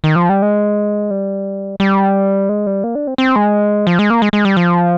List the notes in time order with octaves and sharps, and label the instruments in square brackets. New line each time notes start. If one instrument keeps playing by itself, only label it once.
[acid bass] D#3
F3
G3
G#3
G3
G3
G#3
G3
A#3
D4
C4
C4
G#3
F3
G#3
A#3
G#3
G#3
G3
F3